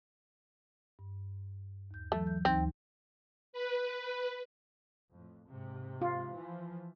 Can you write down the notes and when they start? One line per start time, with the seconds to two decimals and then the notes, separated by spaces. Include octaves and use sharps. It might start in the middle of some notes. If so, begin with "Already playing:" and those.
0.99 G2
1.91 D#2 G6
2.12 E3 F#3 A3
2.27 G6
2.45 D2 E3 C4 D#4
3.53 B4
5.12 F2 A2
5.48 G#2 C3
6.02 F4
6.36 E3 F3